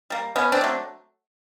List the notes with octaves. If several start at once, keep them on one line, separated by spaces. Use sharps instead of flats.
G3 A#3
B2 B3 C#4
C4 D4
F#3 A3